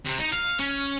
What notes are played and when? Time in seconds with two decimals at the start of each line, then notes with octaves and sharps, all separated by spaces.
0.06 C3
0.19 D#4
0.33 F5
0.59 C#4